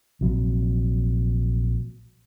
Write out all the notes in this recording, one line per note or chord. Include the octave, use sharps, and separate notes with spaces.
A#1 C3 F#3